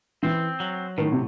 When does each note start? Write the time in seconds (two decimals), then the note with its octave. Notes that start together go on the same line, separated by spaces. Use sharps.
0.23 E3 C4
0.60 F#3
0.98 A2 D#3
1.12 C3